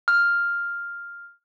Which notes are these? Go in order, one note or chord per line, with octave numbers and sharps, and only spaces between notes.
F6